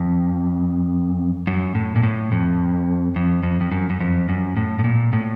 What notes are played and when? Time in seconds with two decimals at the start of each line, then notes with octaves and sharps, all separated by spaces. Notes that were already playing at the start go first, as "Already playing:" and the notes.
Already playing: F2
1.47 F#2
1.75 A2
1.96 A#2
2.03 A2
2.32 F2
3.16 F2
3.43 F2
3.61 F2
3.72 F#2
3.90 F#2
4.00 F2
4.29 F#2
4.57 A2
4.79 A2
4.84 A#2
5.13 A2